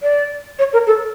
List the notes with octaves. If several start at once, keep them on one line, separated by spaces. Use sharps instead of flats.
D5
C#5
A#4
A4